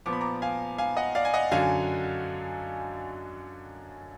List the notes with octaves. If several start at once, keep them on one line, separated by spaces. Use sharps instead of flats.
A#2 F3 B3 D6
B5
A#5 D6
F5 G#5
F5 G#5
D#5 F#5
D5 F5
G#5
D#5 F#5
F#2 D3 F#3 F5 G#5